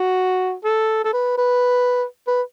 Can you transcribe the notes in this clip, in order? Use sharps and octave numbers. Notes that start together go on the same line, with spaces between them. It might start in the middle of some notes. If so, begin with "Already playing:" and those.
Already playing: F#4
A4
A4
B4
B4
B4